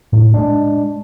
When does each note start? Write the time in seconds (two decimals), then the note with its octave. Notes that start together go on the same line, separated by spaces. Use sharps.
0.13 A2
0.34 G#3 D4